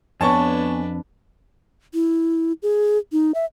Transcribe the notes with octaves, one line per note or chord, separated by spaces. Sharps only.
F2 B3 D4 B4 C#5 G#5 A5 C#6
E4
G#4
D#4
E5